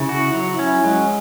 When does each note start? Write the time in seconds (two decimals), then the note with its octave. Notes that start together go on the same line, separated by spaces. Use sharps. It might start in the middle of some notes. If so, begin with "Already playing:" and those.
Already playing: C#3 E4
0.09 F#4
0.33 F#3 E4
0.59 C#4
0.84 F#3 G#3